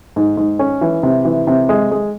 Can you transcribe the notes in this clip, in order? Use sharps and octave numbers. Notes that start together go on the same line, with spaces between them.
G#2
G#2
C#4
E3
C3
E3
C3
G#3
G#3